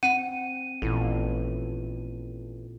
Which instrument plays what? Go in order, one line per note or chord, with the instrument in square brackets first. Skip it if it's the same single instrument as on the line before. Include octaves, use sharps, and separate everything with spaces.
[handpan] C4 [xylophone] F#5 [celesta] D#7
[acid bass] A1 [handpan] A#2 E4 A4